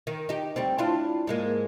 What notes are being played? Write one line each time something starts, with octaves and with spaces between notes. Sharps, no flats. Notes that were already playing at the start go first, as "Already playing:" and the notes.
D#3
D#4 G4
D2 G3 C4
D4 E4 F4
G#2 G#3 A#3